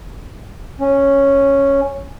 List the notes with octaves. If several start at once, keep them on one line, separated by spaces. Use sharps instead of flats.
C#4